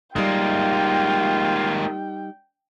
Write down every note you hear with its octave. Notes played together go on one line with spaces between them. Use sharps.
G3 G#3 A#3 D#4 F4 G5